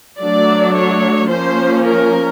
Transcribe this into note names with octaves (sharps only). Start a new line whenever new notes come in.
F#3 A3 D4 D5
C#5
F3 A#3 C#4 C5
A#4